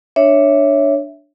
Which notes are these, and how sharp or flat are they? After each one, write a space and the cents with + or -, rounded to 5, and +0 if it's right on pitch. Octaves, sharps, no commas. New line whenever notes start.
D4 +0 C#5 +0 E5 +0